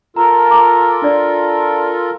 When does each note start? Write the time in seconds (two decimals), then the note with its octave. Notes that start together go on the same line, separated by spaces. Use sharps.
0.16 F4 A4 A#4 A#5
0.48 A#5 D6
1.02 D4 D5